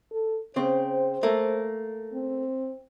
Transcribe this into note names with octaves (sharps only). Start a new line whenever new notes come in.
A4
C#3 C4 C5
A3 A#3
C4